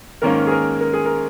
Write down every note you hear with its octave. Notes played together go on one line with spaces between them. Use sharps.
G#2 D#3 A#3 C#4 A#4
G#4
A#4
A#4
G#4
A#4